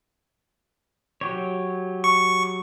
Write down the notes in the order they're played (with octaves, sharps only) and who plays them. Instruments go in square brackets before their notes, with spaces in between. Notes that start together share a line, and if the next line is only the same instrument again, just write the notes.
[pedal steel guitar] F#3 G4 C#5
[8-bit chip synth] C#6